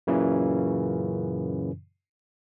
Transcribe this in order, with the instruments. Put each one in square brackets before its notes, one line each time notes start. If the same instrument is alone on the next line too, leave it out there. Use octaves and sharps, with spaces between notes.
[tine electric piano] F#2 A#2 C#3 E3